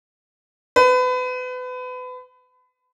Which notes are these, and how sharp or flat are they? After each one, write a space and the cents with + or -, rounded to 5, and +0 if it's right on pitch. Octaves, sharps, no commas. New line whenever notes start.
B4 +30